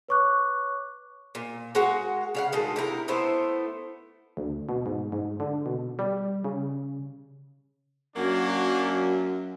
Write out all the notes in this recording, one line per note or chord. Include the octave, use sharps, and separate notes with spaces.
B4 C#5 C#6 D6 F#6
A#2
G#3 F#4 A#4 F#5
C#3 F5 F#5
B2 D#3 G#3 A3
C3 E4 A#4
A3 B3 E4 C5
D2
B2
G#2
G#2
D3
B2
G3
C#3
F#2 F#3 A#3 D4